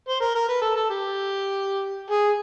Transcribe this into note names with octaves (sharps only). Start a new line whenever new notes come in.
C5
A#4
A#4
B4
A4
A4
G4
G#4